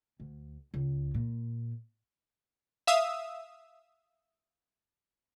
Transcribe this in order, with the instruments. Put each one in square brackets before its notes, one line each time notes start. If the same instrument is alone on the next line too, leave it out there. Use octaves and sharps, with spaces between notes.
[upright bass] D2
C#2
A#2
[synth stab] E5 F5 D#6 E6